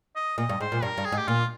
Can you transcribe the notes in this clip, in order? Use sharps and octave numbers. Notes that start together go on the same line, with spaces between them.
D#5
A#2 D#5
G2
G#2 C5
A#2
G2 A#4
G2
G#4
G#2
G4
A#2 F4